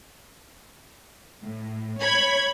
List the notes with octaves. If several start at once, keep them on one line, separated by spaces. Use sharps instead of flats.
A2
C#5 B5 G#6